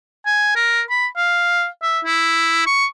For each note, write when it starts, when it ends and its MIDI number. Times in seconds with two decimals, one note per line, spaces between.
0.26 0.55 80
0.56 0.82 70
0.90 1.07 83
1.17 1.67 77
1.83 2.00 76
2.05 2.65 64
2.66 2.85 85